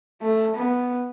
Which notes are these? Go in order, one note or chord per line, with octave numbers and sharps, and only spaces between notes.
A3
B3